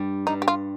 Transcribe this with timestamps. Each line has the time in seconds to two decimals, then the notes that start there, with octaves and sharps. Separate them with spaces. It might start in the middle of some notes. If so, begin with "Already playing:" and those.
Already playing: G2 G3
0.27 G2 D#4
0.42 G4
0.48 F4